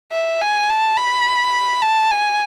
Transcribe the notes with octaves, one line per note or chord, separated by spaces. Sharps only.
E5
G#5
A5
B5
A5
G#5